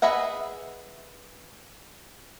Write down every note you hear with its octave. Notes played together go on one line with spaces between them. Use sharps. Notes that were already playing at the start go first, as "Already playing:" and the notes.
G#4 B4 D#5 E5 F#5